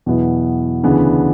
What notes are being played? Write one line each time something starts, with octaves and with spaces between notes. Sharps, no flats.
E2 B2 F#3 B3 E4
D2 C#3 E3 B3 D4